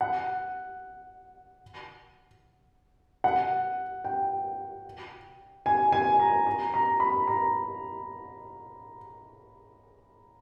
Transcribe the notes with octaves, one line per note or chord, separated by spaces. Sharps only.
F#5
F#5
G5
G#5
G#5
A#5
A#5
A#5
B5
A#5